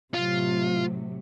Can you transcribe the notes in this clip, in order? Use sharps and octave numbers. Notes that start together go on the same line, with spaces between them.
A2 C3 F#3 F4